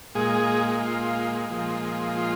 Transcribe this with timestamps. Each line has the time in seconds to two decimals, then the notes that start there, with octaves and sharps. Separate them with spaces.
0.15 A#2 G#3 G#4
0.82 F4
1.50 A#2 F3 G#3
2.17 F4